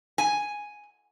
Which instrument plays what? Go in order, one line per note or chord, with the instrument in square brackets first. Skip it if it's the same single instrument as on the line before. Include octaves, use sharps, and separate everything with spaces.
[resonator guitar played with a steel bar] G#5